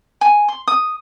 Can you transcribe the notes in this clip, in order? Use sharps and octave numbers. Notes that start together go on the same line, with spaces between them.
G#5
C6
D#6